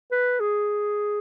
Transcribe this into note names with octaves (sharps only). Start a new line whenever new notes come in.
B4
G#4